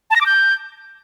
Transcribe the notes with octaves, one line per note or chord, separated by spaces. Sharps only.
A5
A#6
D6
G6